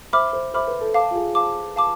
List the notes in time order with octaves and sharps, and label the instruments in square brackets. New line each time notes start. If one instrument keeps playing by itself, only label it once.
[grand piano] C5 [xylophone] E5 B5 D6 F6
[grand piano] C5
[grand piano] C5 [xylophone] E5 B5 D6 F6
[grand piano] B4
A4
[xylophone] F5 A5 D6
[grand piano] F4
G#4
[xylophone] F5 A5 D6
F5 A5 D6